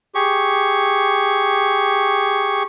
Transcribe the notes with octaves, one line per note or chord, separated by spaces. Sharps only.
G4 G#4 C#6